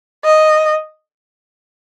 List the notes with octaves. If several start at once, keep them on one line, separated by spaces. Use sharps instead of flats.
D#5